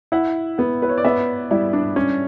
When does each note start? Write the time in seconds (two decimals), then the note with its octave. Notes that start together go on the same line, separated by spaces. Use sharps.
0.12 E4 F#5
0.58 B3 F#5
0.82 B4
0.89 C#5
0.98 D5
1.04 B3 E5
1.51 G3 E4
1.73 D4
1.96 C#4